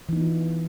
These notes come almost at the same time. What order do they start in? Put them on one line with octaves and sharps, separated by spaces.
E3 D#4 B3 F4